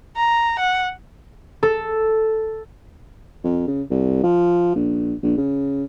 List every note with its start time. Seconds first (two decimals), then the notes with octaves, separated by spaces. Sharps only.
0.16 A#5
0.59 F#5
1.63 A4
3.44 F2
3.67 C#3
3.90 C2
4.23 F3
4.75 A#1
5.23 A#1
5.37 C#3